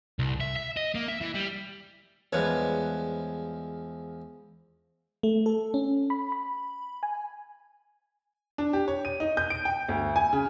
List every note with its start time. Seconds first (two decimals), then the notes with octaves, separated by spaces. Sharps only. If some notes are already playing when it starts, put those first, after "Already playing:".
0.19 C2
0.40 E5
0.56 E5
0.77 D#5
0.95 A#3
1.08 E5
1.21 E3
1.35 G3
2.33 E2 F3 G3 G#3 B4 C#5
5.23 A3
5.46 A4
5.74 C#4
6.10 B5
6.32 B5
7.03 G#5
8.58 D4
8.73 G4
8.88 C#5
9.05 D#7
9.20 D#4
9.37 G6
9.50 D7
9.65 G5
9.89 D2
10.16 G#5
10.33 C#3